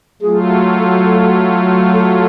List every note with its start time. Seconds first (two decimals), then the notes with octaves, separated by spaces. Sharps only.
0.22 F#3 A3 F4 G#4
0.78 A4
1.93 A4